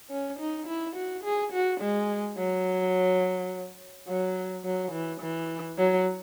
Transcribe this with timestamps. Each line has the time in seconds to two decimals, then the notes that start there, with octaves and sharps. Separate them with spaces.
0.10 C#4
0.39 D#4
0.67 E4
0.96 F#4
1.24 G#4
1.53 F#4
1.80 G#3
2.37 F#3
4.08 F#3
4.65 F#3
4.92 E3
5.21 E3
5.77 F#3